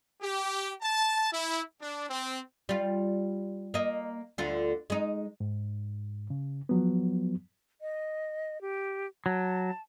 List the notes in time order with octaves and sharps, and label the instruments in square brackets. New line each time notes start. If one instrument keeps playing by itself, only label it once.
[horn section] G4
A5
E4
D4
C4
[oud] G3 F4
A#3 D#5
D2 D3 F4
G#3 D#4
[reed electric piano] G#2
C#3
F3 F#3 B3
[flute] D#5
G4
[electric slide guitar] F#3 [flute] A5